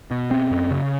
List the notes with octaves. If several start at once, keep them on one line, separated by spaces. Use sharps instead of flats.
B2
C4
F#2
C#3